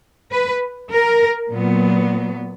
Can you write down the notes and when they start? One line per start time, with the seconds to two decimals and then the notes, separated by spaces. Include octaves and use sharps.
0.32 B4
0.91 A#4
1.51 A#2 F#3 B3